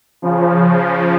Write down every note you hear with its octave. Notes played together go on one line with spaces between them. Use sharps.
C#3 F3